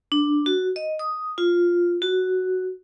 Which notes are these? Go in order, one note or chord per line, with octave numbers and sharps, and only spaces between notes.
D4
F#4
D#5
D#6
F4
F#4